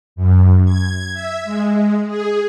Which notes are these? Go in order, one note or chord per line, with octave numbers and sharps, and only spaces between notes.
F#2
G#6
E5
G#3
G#4